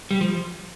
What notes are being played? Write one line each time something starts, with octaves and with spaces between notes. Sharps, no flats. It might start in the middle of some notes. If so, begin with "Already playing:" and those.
G3
F3